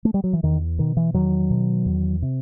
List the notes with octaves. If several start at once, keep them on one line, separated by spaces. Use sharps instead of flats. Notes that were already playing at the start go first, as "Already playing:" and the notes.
A3
G3
F#3
E3
E2 D#3
B2 D#3
E3
E2 D#3 F#3
B2
E2
C3